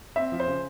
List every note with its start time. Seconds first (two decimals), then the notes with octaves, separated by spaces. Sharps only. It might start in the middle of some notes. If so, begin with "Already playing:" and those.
0.16 C4 E5
0.32 F3
0.40 C5
0.47 C#3